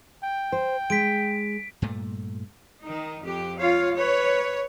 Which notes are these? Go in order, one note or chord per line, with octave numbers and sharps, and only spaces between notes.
G5
C5
G#3 B6 D7
G2 A#2 A3
D#3 D#4
F2 G4
F4 C#5 F5
B4 C#5